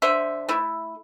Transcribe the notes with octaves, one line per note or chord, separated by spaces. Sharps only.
D3 C5 E5
A3 E4